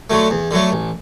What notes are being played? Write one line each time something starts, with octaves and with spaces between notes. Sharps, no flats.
D3 F#3 A3
E2
D3 F#3 A3
A1